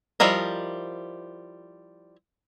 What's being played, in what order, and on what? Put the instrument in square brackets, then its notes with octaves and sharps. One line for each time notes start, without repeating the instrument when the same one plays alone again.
[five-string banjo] F3 G3 E4 A#4 D#5